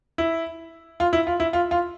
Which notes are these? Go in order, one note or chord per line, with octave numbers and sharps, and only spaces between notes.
E4
F4
E4
F4
E4
F4
F4